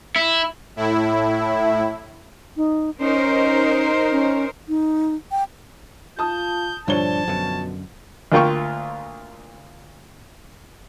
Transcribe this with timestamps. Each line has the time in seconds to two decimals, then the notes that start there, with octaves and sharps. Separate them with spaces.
0.16 E4
0.76 A2 E4
2.57 D#4
2.99 C#4 D#4 A#4 C5
4.11 C#4
4.68 D#4
5.32 G5
6.19 F4 A5 D#6 G6
6.88 G2 A#2 D3 F3 D4 C#5 A5 G7
7.27 F#2 B2 D3
8.32 D2 A#3 F4 G5 C#6